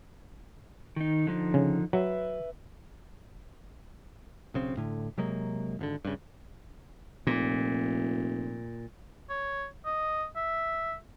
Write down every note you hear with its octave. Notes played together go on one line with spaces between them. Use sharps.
D#3 D#4
D3 F3 D#4
C#3
F#3 B4 E5
B1 C#3 C4
A2 D3
C3 F#3 G#3 A#3
G#1 B2 D3
G2 C#3
F1 A#2
C#5
D#5
E5